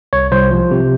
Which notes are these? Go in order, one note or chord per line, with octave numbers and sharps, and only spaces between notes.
C2 C#5
C2 C5
F3
C3